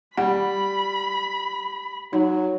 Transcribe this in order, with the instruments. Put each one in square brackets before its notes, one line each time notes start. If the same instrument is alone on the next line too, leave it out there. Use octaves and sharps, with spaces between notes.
[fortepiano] G3 [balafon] F#5 [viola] B5
[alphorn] F#3 [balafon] D#4